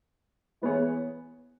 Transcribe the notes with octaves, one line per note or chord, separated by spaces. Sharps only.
E3 B3 E4 G#4 C#5